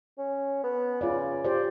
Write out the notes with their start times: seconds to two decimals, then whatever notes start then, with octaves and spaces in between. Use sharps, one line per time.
0.18 C#4
0.63 B3
1.01 C#3 F4 D5
1.44 G4 C5 D5